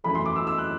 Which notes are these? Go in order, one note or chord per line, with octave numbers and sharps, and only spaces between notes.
F#2 E3 A3 B5
C6
D6
E6
E6
F#6